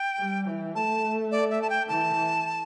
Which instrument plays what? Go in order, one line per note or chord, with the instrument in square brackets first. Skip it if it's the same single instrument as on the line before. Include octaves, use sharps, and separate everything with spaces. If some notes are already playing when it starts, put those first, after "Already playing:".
Already playing: [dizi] G5
[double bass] G3
E3
[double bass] A3 [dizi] A5
[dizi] D5
E5
A5
G5
[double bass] E3 [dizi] A5